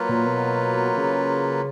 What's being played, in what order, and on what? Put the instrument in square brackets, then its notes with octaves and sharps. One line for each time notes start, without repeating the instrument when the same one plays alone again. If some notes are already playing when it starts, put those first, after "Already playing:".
Already playing: [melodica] F#3 A#3 F4 B4
[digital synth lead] A#2
B2
C#3